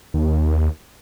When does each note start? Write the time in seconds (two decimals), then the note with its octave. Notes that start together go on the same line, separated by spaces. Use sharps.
0.14 D#2